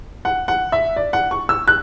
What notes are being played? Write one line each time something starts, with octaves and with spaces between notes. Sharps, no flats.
F#5
F#5
E5
D5
F#5
C#6
E6
F#6